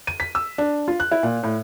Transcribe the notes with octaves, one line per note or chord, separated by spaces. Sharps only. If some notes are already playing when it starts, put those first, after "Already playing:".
D#7
B6
E6
D4
F4
F#6
E4
A#2
A2